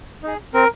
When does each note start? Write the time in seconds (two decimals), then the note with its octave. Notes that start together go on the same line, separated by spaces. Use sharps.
0.23 D#4 G#4
0.54 C4 A#4